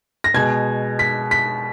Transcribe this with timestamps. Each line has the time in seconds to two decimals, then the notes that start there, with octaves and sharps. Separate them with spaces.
0.24 A#6
0.34 B2 G#3 G#6
0.99 B6
1.31 B6